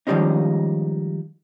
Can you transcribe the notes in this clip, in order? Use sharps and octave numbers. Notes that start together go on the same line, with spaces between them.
D#3 F3 G3 G#3 C#4 D#4